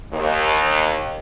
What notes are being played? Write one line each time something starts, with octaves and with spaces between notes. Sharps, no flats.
D#2